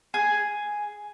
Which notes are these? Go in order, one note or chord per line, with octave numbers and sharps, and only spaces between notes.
G#4